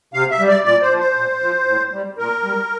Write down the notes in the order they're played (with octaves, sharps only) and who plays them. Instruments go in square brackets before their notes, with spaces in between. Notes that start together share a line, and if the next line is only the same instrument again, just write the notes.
[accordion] C3 F5
E5
G3
D5
A#2 D5
C5
F3
C5
A#2
F3
A2
G3
A#2 A#4
G3